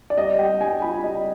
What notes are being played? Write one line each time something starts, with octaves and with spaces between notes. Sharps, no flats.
D5
G3 D#5
G3 G5
G3 G#5
F4 B5
G3 D#5